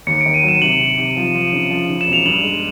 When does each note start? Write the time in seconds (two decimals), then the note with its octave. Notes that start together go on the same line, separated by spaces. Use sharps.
0.07 D#2 C#7
0.21 D7
0.26 D#3
0.34 D#7
0.43 F#3
0.48 E7
0.62 C3 F#7
0.80 C3
0.98 C3
1.17 F3
1.34 F3
1.53 C#3
1.71 F3
1.89 C#3
2.01 E7
2.07 E1
2.13 F7
2.26 G2 F#7
2.43 G#3